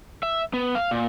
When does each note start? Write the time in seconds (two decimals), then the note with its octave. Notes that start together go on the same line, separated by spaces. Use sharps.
0.23 E5
0.53 B3
0.75 F5
0.91 A#2